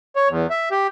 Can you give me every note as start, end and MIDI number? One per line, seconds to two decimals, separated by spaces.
0.16 0.29 73
0.29 0.47 40
0.50 0.69 76
0.71 0.87 67